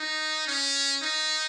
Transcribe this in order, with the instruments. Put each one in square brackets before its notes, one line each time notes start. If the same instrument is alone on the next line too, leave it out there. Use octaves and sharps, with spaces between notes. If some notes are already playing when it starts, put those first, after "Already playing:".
Already playing: [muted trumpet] D#4
C#4
D#4